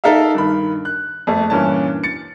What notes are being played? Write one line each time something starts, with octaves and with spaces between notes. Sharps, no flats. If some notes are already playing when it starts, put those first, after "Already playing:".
D#4 A4 A#4 E5 F5
G2 D#3 B5
F#6
F2 A3
G2 A#2 E3 C#4 A5
A6 C#7